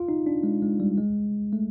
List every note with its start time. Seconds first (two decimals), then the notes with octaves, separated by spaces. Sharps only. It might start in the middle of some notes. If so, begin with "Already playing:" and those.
Already playing: F4
0.09 D#4
0.26 D4
0.43 G#3
0.62 G#3
0.80 G3
0.98 G#3
1.53 A3